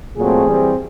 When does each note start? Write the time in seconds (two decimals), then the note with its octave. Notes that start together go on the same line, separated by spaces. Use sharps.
0.17 A#2 F#3 A3 C4 G#4
0.46 E3 G3 C4